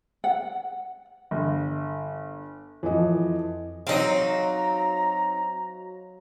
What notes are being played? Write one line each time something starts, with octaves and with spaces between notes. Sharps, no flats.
F#5
G1
F2 E3 F3 D#5
F#3 C4 D#4 D#5 F5
A#5